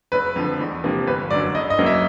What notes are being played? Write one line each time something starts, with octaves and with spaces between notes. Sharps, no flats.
F#1 B4
F2 D3 F3
E2
C3 F3 A#3
G1 B4
F#2 D3 F#3 D5
F#1 D#5
D#5
F#2 C#3 F#3 A#3
E5